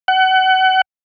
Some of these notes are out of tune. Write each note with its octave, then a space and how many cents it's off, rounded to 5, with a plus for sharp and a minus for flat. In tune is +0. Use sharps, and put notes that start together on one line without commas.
F#5 +30